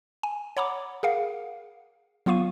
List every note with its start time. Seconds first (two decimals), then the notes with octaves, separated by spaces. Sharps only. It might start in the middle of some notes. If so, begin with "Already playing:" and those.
0.23 G#5
0.57 C#5 F#5 A#5 B5 D6
1.03 G#4 A#4 F5 F#5
2.26 F#3 B3 F4 F5 C#6 D#7